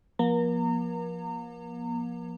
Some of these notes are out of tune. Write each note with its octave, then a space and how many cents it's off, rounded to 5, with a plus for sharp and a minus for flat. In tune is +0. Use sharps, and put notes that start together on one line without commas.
F3 +0 A#3 +40 A#5 -30